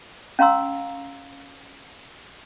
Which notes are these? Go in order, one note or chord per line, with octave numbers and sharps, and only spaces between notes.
C#4 F5 A#5 C6 E6